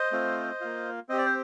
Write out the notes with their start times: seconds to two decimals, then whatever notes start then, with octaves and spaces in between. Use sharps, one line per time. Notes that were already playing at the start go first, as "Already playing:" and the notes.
Already playing: C5 D#5
0.12 A3 C4 F4
0.61 A#3 F4
1.09 C4 G4 D#5
1.18 D5
1.26 C5